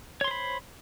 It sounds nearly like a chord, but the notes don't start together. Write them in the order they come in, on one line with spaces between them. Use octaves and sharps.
C#5 C6 C5 B5